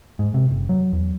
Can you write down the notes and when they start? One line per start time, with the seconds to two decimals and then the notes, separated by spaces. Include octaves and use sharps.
0.19 G#2
0.34 C3
0.50 F#1
0.69 F#3
0.93 E2